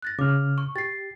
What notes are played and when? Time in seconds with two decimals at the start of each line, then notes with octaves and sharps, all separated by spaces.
0.02 F#6 A6 A#6
0.19 C#3 D6 F6
0.58 C#6
0.76 G4 A6 C7